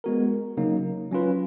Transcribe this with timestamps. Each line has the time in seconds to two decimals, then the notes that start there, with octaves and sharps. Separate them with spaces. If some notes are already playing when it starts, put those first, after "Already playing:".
0.04 G#3 B3 F#4 A#4
0.57 C#3 F#3 A#3 D#4
1.11 F#3 C#4 F4 B4